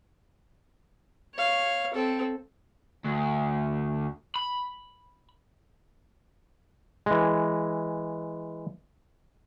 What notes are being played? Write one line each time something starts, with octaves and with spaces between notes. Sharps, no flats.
C#5 F5
C4 A4
D2
B5
E3 G#3